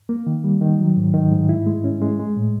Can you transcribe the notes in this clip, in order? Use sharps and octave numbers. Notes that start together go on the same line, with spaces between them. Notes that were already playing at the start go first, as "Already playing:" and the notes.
A#3
D#3
G3
D#3
F#3
G#2
D#3
G#2
E4
G#3
C#4
G#3
G#3
A2